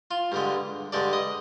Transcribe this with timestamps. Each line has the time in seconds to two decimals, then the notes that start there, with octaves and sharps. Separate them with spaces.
0.11 F4
0.32 G2 D3 G#3
0.92 G2 D3 G#3 D5
1.13 D#5